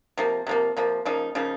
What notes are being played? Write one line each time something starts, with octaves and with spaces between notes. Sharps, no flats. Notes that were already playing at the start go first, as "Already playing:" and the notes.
C3 F3 A#3
C3 F3 A#3
C3 F3 A#3
C#3 F3 A#3 D#4
C#3 F3 A#3 D#4